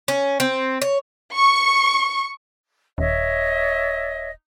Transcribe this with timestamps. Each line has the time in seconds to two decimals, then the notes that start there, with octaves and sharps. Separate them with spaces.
0.08 C#4
0.40 C4
0.82 C#5
1.35 C#6
2.98 D#1 C#5 D#5 E5